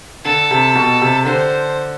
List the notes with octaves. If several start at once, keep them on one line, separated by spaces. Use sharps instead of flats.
D3 A4
C3
B2
C3
D3 C5